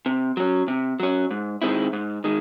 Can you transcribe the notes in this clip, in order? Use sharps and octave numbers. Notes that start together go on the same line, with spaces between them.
C3
F#3 C#4
C3
F#3 C#4
G#2
D#3 G#3 C4 E4
G#2
D#3 G#3